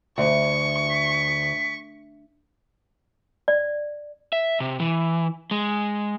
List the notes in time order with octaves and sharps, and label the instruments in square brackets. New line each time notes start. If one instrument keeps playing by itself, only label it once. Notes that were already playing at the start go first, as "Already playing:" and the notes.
[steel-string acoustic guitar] D2 [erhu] C#6
[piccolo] B6
[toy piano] D5
[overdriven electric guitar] E5
C3
E3
G#3